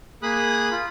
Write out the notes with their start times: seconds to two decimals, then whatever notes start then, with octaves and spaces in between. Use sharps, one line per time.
0.22 A#3 G#4 B5 D#6 F#6
0.72 F4